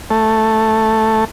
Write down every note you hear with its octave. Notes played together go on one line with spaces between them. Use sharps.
A3